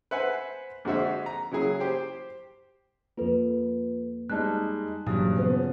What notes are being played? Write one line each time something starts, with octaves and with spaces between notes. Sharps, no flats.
B4 C5 E5 F#5 G#5 B5
F2 D3 G#3 F#4 C5 E5
A#5
C#3 F#3 E4 G#4
G4 C5 G5
F2 A#3 F4 A4 B4
G3 G#3 D#4 A5 F#6
F#1 G2 A#2 E3 F#3 D#6
C#3 F3 B3